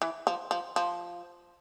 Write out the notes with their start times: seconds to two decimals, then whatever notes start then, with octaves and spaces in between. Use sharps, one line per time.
0.02 E3
0.27 F3
0.51 F3
0.76 F3